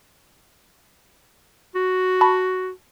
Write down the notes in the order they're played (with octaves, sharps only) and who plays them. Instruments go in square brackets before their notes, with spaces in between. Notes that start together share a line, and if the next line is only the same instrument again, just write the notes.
[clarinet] F#4
[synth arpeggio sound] A5 B5 C#6